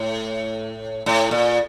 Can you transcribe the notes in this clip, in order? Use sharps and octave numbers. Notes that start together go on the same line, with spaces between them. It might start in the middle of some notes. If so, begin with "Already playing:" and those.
Already playing: A2
A2
A#2